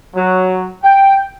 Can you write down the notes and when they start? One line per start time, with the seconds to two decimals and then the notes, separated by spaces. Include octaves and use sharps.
0.15 F#3
0.84 G5